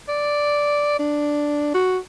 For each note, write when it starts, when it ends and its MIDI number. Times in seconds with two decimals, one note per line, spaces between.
0.09 0.97 74
0.99 1.73 62
1.74 1.98 66